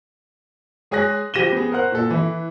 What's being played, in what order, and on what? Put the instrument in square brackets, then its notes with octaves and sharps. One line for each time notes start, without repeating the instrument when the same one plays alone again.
[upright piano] G#3 G#4 C#5 G#5 F#6 A#6
F3 G4 A#6 D#7 E7 G7
B3 G#4
A#4 C5 F#5 F#6
A#2 A4
E3 E4